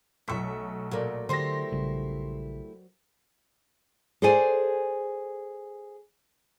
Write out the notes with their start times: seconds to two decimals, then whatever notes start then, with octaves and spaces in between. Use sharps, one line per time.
0.28 B1 A3 E5 C#6 B6
0.91 A#2 F#3 A3 A#4 D5
1.29 D3 A3 E4 G4 C5 C6 A#6
1.72 A#1 C#3 G3
4.22 G#4 A4 C5 D5 G#5